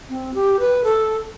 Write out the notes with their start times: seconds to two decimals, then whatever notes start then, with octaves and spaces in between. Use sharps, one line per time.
0.10 C4
0.34 G4
0.60 B4
0.84 A4